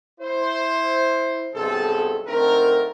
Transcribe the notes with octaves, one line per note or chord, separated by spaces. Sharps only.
E4 C5
B1 G2 C3 G#4 A4
D3 A3 C4 D#4 A#4